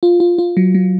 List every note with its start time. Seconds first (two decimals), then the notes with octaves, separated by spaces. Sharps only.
0.03 F4
0.20 F4
0.38 F4
0.57 F#3
0.75 F#3